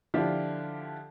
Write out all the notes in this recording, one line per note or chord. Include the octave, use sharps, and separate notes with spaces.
D3 F3 D4 E4 F4 G4